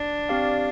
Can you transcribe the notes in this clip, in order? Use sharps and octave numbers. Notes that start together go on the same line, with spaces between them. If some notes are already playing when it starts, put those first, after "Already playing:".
Already playing: D4
C4 G4 D5 F5